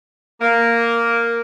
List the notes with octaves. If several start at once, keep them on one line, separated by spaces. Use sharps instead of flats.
A#3